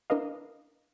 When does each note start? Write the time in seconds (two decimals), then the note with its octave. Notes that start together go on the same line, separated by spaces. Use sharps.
0.10 D4 E4 A#4 B4 D#5 F5